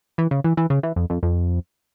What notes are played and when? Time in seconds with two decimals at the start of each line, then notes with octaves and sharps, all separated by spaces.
0.18 E3
0.31 C#3
0.44 E3
0.57 E3
0.70 C#3
0.83 E3
0.96 F2
1.10 F2
1.23 F2